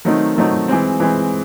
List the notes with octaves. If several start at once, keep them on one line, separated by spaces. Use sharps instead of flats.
D#3 F#3 A3 C4 D#4
D#3 F#3 A3 C4 D#4
E3 G#3 C4
E3 G#3 C4